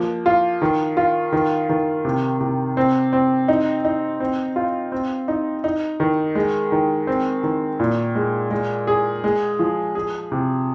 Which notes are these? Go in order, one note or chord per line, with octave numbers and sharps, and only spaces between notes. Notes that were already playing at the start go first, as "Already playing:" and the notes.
Already playing: F3 A#3
F4
D#3
F4
D#3
D#3
C3
C3
C4
C4
D#4
D#4
C4
F4
C4
D#4
D#4
D#3
G#3
D#3
C4
D#3
A#2
G#3
G#3
G#4
G#3
F3
G#4
C3